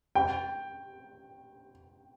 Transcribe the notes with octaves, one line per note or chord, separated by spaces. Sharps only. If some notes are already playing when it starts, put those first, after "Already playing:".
G5